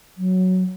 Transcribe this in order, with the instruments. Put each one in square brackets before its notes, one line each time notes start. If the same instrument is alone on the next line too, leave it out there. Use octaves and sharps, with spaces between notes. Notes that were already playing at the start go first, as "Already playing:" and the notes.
[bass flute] F#3